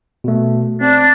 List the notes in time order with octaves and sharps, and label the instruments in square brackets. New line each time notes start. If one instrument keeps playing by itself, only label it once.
[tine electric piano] B2 A3
[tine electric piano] C4 [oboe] D4